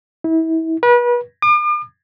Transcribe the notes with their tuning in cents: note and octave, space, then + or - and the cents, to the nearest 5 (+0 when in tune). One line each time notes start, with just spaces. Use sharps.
E4 -30
B4 -35
D6 +45